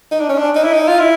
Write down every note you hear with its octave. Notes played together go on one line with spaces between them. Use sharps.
D#4
D4
C#4
D4
D#4
E4
D#4
F4
E4